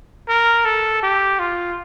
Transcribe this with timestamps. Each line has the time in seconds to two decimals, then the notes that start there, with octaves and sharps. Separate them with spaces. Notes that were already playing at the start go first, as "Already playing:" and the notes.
0.28 A#4
0.65 A4
1.02 G4
1.39 F4